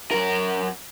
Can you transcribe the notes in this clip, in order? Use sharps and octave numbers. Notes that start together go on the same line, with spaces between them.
F#2 A#4